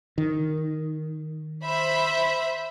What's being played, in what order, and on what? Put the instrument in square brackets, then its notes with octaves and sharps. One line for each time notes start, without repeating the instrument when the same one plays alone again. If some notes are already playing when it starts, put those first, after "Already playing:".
[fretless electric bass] D#3
[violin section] C5 E5 B5